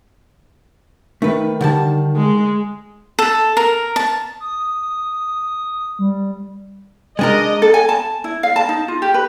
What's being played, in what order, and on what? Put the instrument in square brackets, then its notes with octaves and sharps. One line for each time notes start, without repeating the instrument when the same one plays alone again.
[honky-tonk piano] D#3 [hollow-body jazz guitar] A3 B4
[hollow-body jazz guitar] D3 G3 A5
[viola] G#3
[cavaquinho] A4
A#4
A5
[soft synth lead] D#6
G3
[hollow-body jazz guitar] G#3 D4 A#4 [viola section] D#5
[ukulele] A4
G#5
A5
E4
F5
A5
D#4
F4
G4
B4